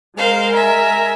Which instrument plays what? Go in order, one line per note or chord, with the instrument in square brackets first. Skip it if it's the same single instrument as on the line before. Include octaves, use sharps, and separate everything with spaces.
[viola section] G#3 A#4 [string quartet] C5 F5
[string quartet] E5 G#5 [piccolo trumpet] A#5